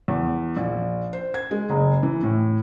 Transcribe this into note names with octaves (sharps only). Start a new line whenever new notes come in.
E2
A#1
C5
G#6
G#3
F#1
E3
A2